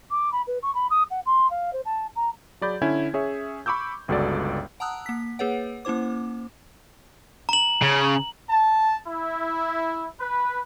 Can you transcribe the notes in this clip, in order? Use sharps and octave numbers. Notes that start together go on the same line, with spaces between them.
D6
B5
B4
C#6
B5
D#6
F#5
C6
F5
C5
A5
A#5
F#3 G#4 D5 B5 G6
D3 C#4 E4 G#5 G#6
C#4 G#4 C#5 E5
B5 C#6 D6 E6 G6
G1 C#2 F#4 A4 D5
F#5 A5 A#5 D#6 E6 F#6
A#3 B6
A#3 G#4 B4 C#5 F#5
A#3 C#4 E4 C5 D6
A#5 F#7
C#3
A5
E4
B4